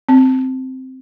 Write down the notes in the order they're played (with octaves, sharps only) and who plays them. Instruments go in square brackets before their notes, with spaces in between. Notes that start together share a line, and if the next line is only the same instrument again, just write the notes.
[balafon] C4